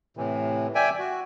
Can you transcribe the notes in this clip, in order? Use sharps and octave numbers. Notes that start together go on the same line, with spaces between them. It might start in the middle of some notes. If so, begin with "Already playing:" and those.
A2 C3 E3
D5 E5 G5 G#5
F#4